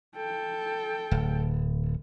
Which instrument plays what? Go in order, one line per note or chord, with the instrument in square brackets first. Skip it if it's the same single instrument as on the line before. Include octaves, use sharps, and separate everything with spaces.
[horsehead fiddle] A4 G5
[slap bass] D1